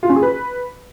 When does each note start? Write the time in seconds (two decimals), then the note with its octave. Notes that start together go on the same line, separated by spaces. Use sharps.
0.03 F4
0.09 C#4
0.16 G#4
0.23 B4